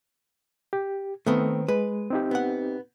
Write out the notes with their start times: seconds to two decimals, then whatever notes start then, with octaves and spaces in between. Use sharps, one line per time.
0.73 G4
1.27 D#3 A3 B3 C4
1.68 G#3 B4
2.10 C4 D#4 G4
2.31 B3 F#5